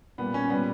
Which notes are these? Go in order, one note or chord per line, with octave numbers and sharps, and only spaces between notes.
A#2 G3 B3
C#4
A#2 G3 B3